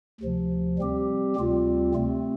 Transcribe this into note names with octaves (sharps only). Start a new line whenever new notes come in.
D2 C3 F3
G3 C4 G4
D2 C3 G3 C4 F4
C3 A3 C4